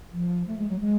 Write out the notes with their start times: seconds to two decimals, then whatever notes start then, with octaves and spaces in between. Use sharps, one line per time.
0.12 F3
0.47 A3
0.58 G#3
0.69 F#3
0.80 G#3